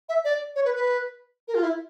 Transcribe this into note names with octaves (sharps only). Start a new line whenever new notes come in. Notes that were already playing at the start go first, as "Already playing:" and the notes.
E5
D5
C#5
B4
B4
A#4
F4
E4